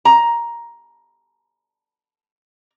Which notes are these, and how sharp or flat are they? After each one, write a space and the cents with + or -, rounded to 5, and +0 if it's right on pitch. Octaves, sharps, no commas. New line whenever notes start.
A#5 +10